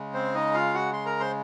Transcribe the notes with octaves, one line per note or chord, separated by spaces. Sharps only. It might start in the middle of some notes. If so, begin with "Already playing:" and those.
Already playing: C#3 G#3
C4 C5
D#4 D#5
F4 F5
F#4 F#5
C6
A#4 A#5
C5 C6